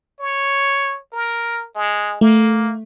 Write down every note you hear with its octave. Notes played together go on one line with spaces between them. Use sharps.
C#5
A#4
G#3
A3 A#3